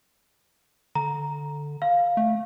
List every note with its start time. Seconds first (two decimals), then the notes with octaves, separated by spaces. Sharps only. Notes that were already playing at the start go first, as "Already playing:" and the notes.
0.95 D3 A#5
1.82 F5
2.17 A3